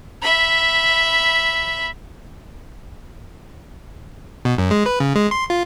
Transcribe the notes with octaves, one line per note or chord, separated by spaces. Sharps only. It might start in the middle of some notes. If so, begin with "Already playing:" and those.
E5 B5
B2
F#2
G#3
B4
C#3
G#3
C6
F4